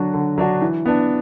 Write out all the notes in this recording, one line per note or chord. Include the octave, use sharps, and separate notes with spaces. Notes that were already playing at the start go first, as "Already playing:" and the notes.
Already playing: D3 F#3 D4 F#4
D3
F#3 D4 F#4
E3
B3 D4